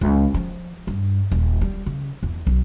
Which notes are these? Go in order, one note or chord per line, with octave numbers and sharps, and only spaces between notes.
C#2
F3
G2
D#1
G3
C#3
E2
B1